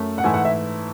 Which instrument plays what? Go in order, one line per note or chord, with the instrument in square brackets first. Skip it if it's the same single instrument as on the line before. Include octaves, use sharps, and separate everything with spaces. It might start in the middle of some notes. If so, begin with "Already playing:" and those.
Already playing: [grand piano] F#2 A3
[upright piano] F#5
[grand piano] G#2 E3 A3 E4 [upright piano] G#5
[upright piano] F#5
E5